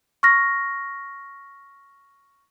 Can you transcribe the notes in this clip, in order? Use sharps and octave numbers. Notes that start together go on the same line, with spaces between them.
C#6 F6 A#6